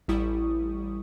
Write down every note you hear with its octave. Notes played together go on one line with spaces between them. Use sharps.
A1 G3 E4 C#6 D#6